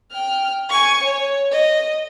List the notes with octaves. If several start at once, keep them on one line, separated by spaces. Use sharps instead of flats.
G5 F6
G#5 C#6
C#5
D#5